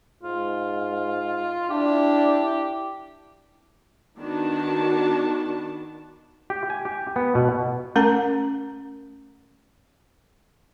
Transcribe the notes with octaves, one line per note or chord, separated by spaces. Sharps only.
G#2 F4
D4 E4 G4
D#3 B3 D4 F#4 A5
G4
G#5
G4
B3
B2
A3 C#4 A#4 A#5